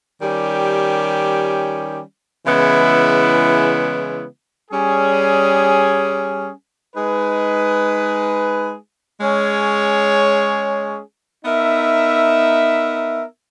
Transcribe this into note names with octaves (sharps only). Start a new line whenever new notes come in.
D#3 G3 C#4 G4
C#3 E3 G#3 B3 E4
G3 C#4 G#4
G#3 D#4 G#4 B4
G#3 C#4 G#4 C#5
B3 D#4 A#4 E5